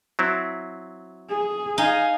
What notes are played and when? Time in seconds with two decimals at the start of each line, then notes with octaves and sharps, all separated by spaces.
0.19 F#3 C4 E4
1.29 G#4
1.78 D#4 F5 G#5